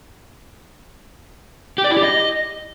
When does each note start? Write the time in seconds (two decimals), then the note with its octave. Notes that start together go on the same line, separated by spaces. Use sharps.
1.78 G4
1.84 D5
1.91 E4
1.97 G4
2.03 D#5